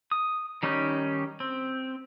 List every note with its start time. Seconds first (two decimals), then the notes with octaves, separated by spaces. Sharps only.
0.11 D#6
0.63 D#3 G3 C#4 D#4 G4
1.40 C4